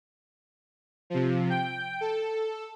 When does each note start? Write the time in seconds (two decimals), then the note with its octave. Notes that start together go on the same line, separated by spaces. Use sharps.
1.10 C3 F3
1.50 G5
2.01 A4